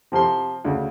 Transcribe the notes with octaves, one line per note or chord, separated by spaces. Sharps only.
C3 F3 C4 C6
D2 C#3